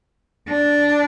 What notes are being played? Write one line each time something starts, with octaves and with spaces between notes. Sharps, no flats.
D4